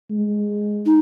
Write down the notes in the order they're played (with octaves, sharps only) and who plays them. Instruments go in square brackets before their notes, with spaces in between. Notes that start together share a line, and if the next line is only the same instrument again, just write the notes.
[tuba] G#3
[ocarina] D#4